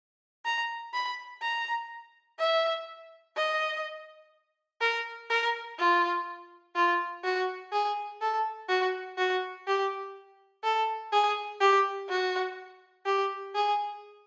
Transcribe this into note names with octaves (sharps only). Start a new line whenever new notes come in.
A#5
B5
A#5
E5
D#5
A#4
A#4
F4
F4
F#4
G#4
A4
F#4
F#4
G4
A4
G#4
G4
F#4
G4
G#4